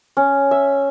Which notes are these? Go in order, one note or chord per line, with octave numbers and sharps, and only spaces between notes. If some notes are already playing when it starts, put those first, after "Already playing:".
C#4
E5